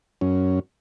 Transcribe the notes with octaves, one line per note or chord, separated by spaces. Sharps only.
F#2 C#4